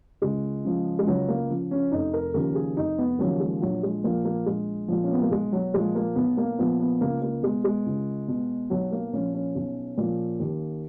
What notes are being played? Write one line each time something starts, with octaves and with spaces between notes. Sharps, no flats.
C#2 G#3
C#3 F3
G#3
C#2 F#3
A#3
C#3 F3
C#4
F1 D#4
A#4
D#2 C#3 F3 A#4
G#4
F1 D#4
B3
D#2 C#3 F3 F#3
G#3
A#1 F#3
G#3
A#2 F3 A#3
A#3
A#1 G#3
A#2 F3
C#4
B3
A#3
B1 G#3
F#3
A#2 F3 G#3
A#3
B1 B3
A#3
A#2 F3 B3
B3
C#2 A#3
A#3
B2 G#3
G#3
C#2
B2
B1 F#3
A#3
A#2 F3 C#4
C#4
B1
A#2 F3
D#2